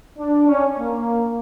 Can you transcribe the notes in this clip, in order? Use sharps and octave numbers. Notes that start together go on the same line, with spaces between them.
D4
C#4
A#3